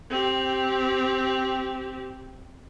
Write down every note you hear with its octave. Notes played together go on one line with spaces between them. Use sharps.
C4 G4